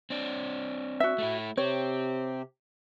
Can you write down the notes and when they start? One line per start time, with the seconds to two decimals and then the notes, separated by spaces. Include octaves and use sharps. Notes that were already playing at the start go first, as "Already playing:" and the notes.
0.10 C4 D4
1.00 F#4 E5
1.18 A3 E4
1.57 C3 C4 G4 C#5